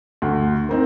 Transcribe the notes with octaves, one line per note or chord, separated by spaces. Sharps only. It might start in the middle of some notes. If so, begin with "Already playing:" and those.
D2
A#3 C4 D#4